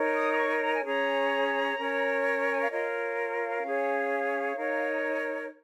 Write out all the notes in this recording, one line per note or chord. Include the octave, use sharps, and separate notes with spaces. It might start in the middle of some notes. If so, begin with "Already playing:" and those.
Already playing: D#4 A#4 C#5
D#6
D#6
C#6
A#5
G#5
C#4 G#4 C#5 A#5
C#4 A#4 C#5
G#5
F5
F4 A#4 C#5 D#5
F5
C#4 G#4 C#5
D#4 A#4 C#5